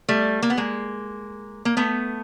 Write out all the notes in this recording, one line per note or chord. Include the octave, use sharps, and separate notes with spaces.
G3 A3
A#3
B3
G#3 A#3
A#3
A3 B3